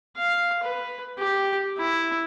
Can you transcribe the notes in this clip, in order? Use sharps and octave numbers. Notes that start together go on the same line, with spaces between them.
F5
B4
G4
E4